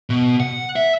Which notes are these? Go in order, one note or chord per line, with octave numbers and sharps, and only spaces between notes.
B2
F#5
E5